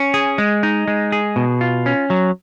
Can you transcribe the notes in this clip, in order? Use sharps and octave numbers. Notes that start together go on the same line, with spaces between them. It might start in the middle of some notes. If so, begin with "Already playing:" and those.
Already playing: C#4
G#4
G#3
D#4
G#3
G#4
B2
F4
C#4
F#3